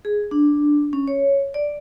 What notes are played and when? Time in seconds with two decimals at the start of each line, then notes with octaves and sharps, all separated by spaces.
0.05 G#4
0.31 D4
0.93 C#4
1.08 C#5
1.54 D5